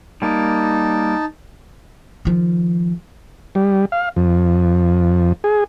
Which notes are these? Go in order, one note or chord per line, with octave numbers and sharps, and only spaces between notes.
G3 A#3 D#4 A5
D#3 F3
G3
F5
F2
G#4